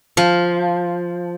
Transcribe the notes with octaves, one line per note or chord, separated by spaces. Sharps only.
F3